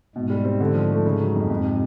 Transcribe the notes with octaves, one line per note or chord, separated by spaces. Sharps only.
G#2 B2 G#3
G3
C4
D3
F3
A3
C#3
F#3
F2
F2 G#2 G#3
C3